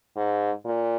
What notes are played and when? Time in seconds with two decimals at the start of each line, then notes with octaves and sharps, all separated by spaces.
0.17 G#2
0.66 A#2